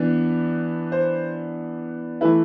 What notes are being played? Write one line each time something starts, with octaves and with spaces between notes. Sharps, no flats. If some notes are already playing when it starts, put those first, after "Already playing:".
Already playing: E3 B3 D4
C5
E3 A3 E4 B4